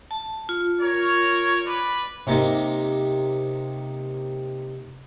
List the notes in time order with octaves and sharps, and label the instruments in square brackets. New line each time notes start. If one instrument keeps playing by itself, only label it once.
[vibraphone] A5
F4
[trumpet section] A#4 C#5
B4 D5
[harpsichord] C3 A#3 D#4